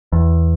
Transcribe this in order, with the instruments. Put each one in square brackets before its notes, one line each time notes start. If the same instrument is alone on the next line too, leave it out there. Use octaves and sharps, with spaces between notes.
[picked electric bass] E2